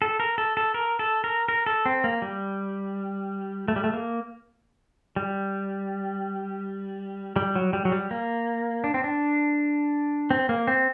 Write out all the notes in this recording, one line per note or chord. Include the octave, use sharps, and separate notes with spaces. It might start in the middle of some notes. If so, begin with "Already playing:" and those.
A4
A#4
A4
A4
A#4
A4
A#4
A#4
A4
C4
A#3
G3
A3
G3
A3
A#3
G3
G3
F#3
G3
F#3
G3
A#3
D4
C4
D4
C4
A#3
C4